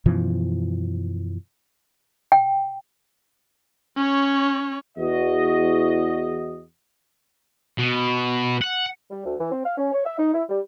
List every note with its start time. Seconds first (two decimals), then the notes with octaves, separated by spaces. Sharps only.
0.06 F#2 B2 E3 F3
2.32 G5
3.97 C#4 C#5
4.98 E2 F#4 D#5
7.79 B2
8.61 F#5
9.11 G3
9.25 D2
9.39 E3
9.51 C4
9.65 F5
9.77 C#4
9.92 C#5
10.05 E5
10.18 D#4
10.33 E4
10.49 G3